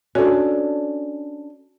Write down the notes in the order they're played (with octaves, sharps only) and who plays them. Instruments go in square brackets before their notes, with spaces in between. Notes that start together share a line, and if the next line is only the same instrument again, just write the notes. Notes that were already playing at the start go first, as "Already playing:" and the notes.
[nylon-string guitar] C#4 D4 A4 [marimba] F#4